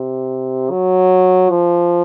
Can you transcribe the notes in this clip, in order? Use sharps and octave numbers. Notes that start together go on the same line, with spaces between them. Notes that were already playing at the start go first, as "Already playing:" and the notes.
Already playing: C3
F#3
F3